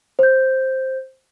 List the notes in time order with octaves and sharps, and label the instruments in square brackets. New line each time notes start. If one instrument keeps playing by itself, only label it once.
[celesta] C5 G6